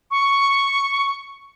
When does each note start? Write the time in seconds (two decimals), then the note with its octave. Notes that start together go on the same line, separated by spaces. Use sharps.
0.11 C#6